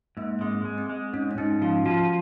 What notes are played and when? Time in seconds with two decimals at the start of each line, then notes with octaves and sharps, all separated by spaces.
0.17 G#2 A#3
0.41 G#3 C4
0.65 G#3
0.78 C4
0.89 G#3
1.13 G#2 C#4
1.31 C#4
1.38 G#2 D#4
1.62 F3 F4
1.85 F3 F#4